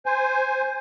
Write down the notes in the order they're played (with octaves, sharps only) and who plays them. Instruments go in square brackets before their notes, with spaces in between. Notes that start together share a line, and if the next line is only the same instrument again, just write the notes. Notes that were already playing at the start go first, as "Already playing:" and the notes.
[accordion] C5 G#5